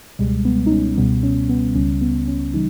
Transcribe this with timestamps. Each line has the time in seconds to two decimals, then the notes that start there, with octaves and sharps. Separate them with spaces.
0.19 C#2 B2 G3 G#3
0.45 B3
0.66 D#4
0.71 C#4
0.97 C#2 B2 G3 B3
1.23 C#4
1.49 B3
1.75 C#2 C#3 G3 C#4
2.01 B3
2.28 C#4
2.54 C#3 E3 G3 D#4